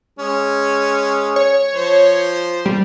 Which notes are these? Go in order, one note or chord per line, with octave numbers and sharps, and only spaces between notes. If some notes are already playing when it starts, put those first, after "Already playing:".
G#3 C#4
C#5
F3 C5
G3